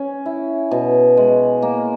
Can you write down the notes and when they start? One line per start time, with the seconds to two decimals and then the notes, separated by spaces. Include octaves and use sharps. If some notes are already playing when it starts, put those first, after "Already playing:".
Already playing: C#4
0.26 E4
0.71 B2
1.17 G#3
1.62 A#3